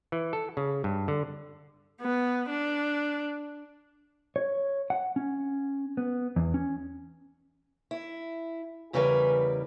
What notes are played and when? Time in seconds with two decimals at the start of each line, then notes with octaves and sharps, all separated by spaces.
0.12 E3
0.33 A4
0.57 C#3
0.84 G2
1.08 D3
2.01 B3
2.50 D4
4.36 C#5
4.90 F#5
5.16 C#4
5.97 B3
6.36 E2
6.54 C#4
7.91 E4
8.93 E2 C#3 E3 G3 A#4 B4